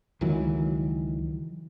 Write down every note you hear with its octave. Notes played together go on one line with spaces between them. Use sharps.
C#2 D#3 E3 F#3